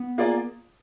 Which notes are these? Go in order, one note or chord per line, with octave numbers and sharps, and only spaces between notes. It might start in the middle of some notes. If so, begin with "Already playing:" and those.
Already playing: B3
A#3 F4 G#4 D5